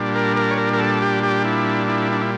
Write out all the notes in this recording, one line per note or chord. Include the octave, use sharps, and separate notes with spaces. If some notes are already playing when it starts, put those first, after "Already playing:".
Already playing: A#2 G3 D4
A#4
A#4
C#5
A#4
A#4
A4
G4
G4
E4
E4
D4
E4